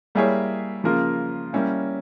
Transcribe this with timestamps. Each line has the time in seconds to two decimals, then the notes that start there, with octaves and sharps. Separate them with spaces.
0.15 G3 A#3 E4 G#4 C#5
0.84 C#3 F3 A#3 F4 A#4
1.53 G3 A#3 C#4 E4